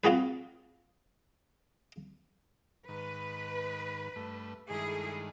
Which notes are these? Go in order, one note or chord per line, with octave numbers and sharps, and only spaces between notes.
C4 F4 F#4 G#4 B4
G#2 D#3 B4
G2 A3
G2 D#3 G#3 E4 G#4 A4